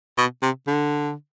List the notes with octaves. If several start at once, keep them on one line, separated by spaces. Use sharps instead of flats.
B2
C3
D3